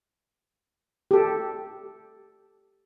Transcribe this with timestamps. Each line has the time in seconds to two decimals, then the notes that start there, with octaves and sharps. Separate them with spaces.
1.11 G4 A4